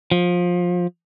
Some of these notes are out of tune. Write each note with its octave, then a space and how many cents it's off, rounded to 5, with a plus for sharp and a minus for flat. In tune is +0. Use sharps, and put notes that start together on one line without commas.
F3 +20